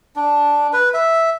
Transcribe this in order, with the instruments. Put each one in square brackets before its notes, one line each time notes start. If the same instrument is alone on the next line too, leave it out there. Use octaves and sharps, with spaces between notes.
[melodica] D4
B4
E5